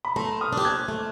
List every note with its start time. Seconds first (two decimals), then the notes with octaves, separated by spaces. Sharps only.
0.05 B5
0.16 A3 A#5 C6
0.41 D#6 F6
0.53 D4 G4
0.65 F#6 G#6
0.88 A3